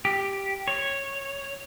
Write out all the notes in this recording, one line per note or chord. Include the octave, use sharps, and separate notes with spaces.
G4
C#5